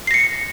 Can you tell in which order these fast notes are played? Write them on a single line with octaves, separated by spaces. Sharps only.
C7 A#6 C#7